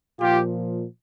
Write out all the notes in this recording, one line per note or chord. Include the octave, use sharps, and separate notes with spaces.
A#2 F3 F4 G4